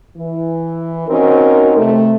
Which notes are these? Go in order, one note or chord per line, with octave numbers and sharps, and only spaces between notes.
E3
C4 C#4 D#4 F#4 A#4
C3 A3